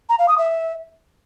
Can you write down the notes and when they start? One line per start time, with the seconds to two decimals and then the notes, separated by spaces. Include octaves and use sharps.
0.09 A#5
0.19 F5
0.28 D#6
0.38 E5